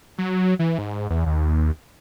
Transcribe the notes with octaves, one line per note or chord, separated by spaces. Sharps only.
F#3
E3
G#2
E2
D#2